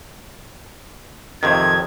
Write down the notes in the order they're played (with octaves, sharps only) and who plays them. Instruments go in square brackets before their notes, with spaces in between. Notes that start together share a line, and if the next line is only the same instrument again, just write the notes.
[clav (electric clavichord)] F2 C3 D#3 [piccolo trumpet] G#6